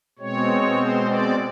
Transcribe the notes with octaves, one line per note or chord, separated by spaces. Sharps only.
B2 G#3 C4 C#5
C5
D5